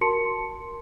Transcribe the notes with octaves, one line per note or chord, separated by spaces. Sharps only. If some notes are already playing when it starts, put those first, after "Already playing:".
F#4 A#4 A5 C6 C#7